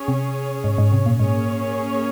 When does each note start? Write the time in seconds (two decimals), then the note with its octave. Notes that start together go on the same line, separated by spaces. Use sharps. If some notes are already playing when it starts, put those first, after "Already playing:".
Already playing: C#4 G#4 C#5
0.08 C3
0.64 G#2
0.78 G#2
0.92 C3
1.06 A#2
1.19 G#2 A#3 C#4 G#4 C#5